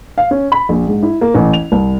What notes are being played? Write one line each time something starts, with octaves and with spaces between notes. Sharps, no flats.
F5
C#4
B5
A#1
G#2
E4
A#3
A1
F7
C2